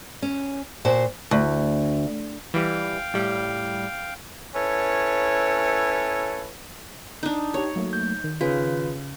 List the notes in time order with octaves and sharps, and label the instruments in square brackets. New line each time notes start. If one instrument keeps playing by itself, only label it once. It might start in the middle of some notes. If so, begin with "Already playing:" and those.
[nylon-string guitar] C#4
A#2 F#4 C5 A5
[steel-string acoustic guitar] D2
[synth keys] E3 G3 [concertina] F5 G5
[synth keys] A2 G3
[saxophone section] C#4 E4 A4 B4 C#5
[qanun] D4 D#4
[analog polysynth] D#4 G4 [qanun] C#5
[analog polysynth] F#3 A3 A#3
[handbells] G6
[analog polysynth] D#3
[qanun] C#3 [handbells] F4 B4